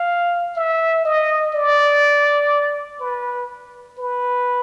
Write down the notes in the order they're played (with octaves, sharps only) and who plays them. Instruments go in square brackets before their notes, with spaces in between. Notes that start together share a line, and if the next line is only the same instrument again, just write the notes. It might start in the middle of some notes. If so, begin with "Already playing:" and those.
Already playing: [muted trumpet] F5
E5
D#5
D5
B4
B4